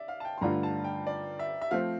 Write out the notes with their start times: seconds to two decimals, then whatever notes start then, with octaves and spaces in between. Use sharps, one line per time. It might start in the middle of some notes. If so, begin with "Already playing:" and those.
Already playing: D5 E5
0.08 F5
0.20 A5
0.25 G5
0.38 C6
0.41 G2 D3 A3 D4 F4 A#5
0.63 A5
0.84 G5
1.07 D5
1.39 E5
1.62 E5
1.71 F3 A3 C4 F5